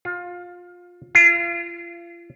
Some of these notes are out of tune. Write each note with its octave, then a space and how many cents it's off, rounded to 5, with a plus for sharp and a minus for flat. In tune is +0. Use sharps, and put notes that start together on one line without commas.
F4 +20
F4 -35